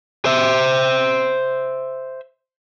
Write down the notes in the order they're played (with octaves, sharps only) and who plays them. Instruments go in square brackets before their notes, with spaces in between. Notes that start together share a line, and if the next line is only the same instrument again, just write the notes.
[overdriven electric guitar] C5 E5